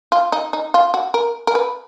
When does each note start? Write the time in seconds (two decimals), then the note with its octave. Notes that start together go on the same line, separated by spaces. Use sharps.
0.12 F4
0.32 D#4
0.53 D#4
0.74 F4
0.94 F#4
1.14 A#4
1.47 A#4
1.55 B4